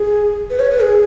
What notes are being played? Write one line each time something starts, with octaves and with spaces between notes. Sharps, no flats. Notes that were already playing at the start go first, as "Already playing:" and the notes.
Already playing: G#4
B4
C#5
B4
G#4